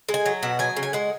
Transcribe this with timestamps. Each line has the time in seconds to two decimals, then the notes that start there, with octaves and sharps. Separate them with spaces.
0.09 G#3
0.14 G#5
0.26 F#3
0.43 B2 F#5
0.59 F#3 G#5
0.77 C#3
0.83 G#5
0.93 G#3 F#5